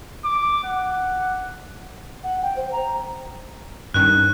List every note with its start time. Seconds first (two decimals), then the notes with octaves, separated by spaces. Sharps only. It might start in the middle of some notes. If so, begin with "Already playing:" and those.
0.24 D6
0.64 F#5
2.24 F#5
2.42 G5
2.56 C5
2.72 A#5
3.94 G2 D#3 C#4 F#6